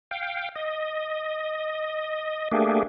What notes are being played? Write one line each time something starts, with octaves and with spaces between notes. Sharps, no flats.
F5 G5
D#5
A3 A#3 D4 G4 G#4